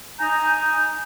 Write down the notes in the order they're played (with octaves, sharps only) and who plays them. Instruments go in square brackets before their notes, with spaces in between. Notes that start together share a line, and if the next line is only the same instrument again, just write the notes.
[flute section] D#4 G#5 A#5 G6